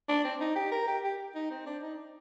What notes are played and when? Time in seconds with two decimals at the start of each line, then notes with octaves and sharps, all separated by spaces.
0.09 D4
0.24 C4
0.41 D#4
0.56 G4
0.72 A#4
0.87 G4
1.04 G4
1.35 D#4
1.50 C4
1.66 D4
1.83 D#4